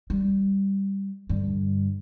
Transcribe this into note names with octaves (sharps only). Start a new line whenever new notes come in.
G3
G2 D3